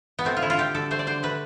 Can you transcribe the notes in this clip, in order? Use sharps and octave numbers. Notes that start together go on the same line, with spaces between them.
B3
A3 C4
F4
D3 E4
F4
A3 G4
D3 A4
A3 C5
D5
D3 C5
A3 B4